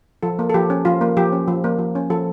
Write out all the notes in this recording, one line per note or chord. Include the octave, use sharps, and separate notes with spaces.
F3 A4
A#3
A4
F3 G4
C#4
F3 F4
A#3
F3 G4
C#4
F3
A#3
F3
C#4
F3 A4